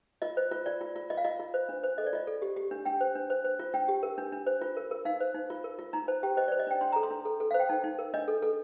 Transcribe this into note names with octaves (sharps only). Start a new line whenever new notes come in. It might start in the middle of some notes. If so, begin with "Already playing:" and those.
F4 D#5
C5
F4
F4 D5
F4
F4
F4 D#5
F5
F4 D#5
F4
C5
D4
C5
A4 D#5
D5
F4 D#5
A4
G4
G4
D4
D4 G5
C5
D4
C5
C5
F4
D4 G5
G4
A#4
D4
D4
C5
F4
A#4
A#4
D#4 F5
C5
D#4
F4
A#4
F4
D#4 A#5
C5 A5
G4 G5
C5 D#5
C5 D5
D#5
D4 G5
D4 C6
A4 A#5
C6
D4
A4
A4
C5 F5
G5
D#4 A5
D#4
A#4
D4 D#5
A4
A4